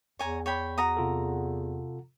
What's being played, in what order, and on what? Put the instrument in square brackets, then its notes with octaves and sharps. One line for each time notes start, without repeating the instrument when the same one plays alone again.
[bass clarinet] E2 [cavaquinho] C#5 G#5 A#5
[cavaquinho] C#5 G5 B5
F#4 A#5 D#6
[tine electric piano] C3 F4 A4